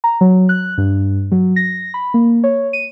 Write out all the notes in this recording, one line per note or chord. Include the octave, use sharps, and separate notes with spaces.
A#5
F#3
F#6
G2
F#3
A#6
B5
A#3
C#5
D#7